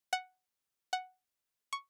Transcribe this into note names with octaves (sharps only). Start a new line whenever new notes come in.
F#5
F#5
C#6